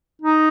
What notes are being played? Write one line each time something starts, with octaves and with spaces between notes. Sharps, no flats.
D#4